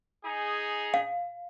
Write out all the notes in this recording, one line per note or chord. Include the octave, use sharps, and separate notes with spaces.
D#4 G#4
F5